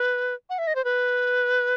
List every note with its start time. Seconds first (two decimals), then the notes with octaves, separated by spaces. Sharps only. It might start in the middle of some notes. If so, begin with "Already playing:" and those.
Already playing: B4
0.50 F#5
0.58 E5
0.67 D#5
0.75 C5
0.84 B4